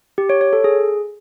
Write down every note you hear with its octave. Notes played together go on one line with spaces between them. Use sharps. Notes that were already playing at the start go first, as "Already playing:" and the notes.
G4
C#5
C#5
A4
G#4